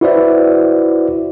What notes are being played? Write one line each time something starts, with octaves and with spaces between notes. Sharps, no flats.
E4 F#4 B4 C5 D5 E5